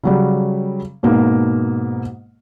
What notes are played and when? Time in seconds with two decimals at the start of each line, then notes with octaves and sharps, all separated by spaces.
0.04 C#3 F#3 G3
1.03 G#2 B2 A#3